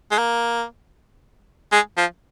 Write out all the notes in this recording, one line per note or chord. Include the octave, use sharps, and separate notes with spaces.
G#3
A#3
G#3
F3